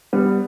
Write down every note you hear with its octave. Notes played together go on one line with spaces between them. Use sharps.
G3 B3